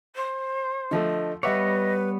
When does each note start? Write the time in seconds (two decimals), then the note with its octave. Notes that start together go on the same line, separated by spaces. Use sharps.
0.15 C5
0.91 D3 F3 A3 D#5
1.43 G3 B3 B4 C#5 D#5 E5 F#5 D6